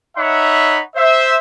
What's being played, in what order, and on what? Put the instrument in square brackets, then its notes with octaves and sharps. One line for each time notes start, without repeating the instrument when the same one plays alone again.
[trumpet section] D#4 C#5 E5 F#5 B5
C5 E5